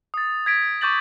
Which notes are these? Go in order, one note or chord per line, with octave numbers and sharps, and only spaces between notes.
D#6 A6
G#6 B6 D7
C#6 D6 G6 A6 F#7